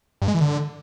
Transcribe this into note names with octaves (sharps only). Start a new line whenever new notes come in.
G2
G#3
E3
D3